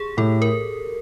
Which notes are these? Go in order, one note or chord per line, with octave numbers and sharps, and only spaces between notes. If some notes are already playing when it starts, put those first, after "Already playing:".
Already playing: G4 G#4
A2 A4
A#4